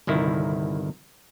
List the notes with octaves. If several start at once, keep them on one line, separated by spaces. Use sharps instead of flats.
G1 C2 D#3 E4